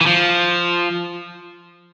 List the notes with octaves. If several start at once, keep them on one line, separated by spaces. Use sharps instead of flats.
E3
F3